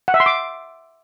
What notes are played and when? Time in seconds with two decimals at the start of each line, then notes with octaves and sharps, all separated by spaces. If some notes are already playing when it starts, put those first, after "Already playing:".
0.08 F#5
0.14 E5
0.20 C6
0.26 D6